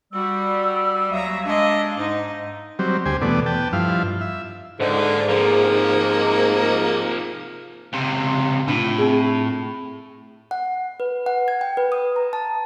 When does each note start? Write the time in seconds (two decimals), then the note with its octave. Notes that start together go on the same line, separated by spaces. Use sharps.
0.13 G3 F#4 E6
1.12 D#2 F#3 E5 F5 A#5 D#6
1.46 G#3 D4 D#5 E5
1.97 G#2 D#4
2.79 F#3 G3 C4
3.06 D2 G4 C5 G#5
3.22 E2 B2 A3 B3 D5
3.46 B3 G5 A5
3.73 G2 F3 E4 F5
4.21 E5
4.80 C#2 G#2 D3
4.99 A#3 B4
5.29 C3 F3 A#3
7.93 C#2 C3
8.68 A2 D4 F4
8.98 C4 G#4
10.51 F#5
11.00 B4
11.26 F#5
11.48 G#6
11.61 G5
11.77 B4
11.92 D#6
12.16 A#5
12.33 A5